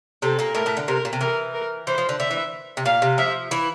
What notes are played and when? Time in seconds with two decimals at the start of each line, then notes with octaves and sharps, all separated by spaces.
0.22 C3 C4 A4
0.39 A#2 A#3
0.55 A2 A3 A#4
0.66 A2 A3
0.77 D3
0.88 C3 A#4
1.05 A#2
1.13 C3
1.21 E3 A#4
1.54 A#4
1.87 E3 C5
1.98 F3
2.09 D3
2.19 D3 E5
2.31 E3
2.77 C3
2.85 A#2 F5
3.02 C3
3.18 F3 E5
3.51 E3 E4